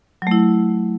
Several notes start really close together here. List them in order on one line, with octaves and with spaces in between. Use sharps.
F#3 A3 E4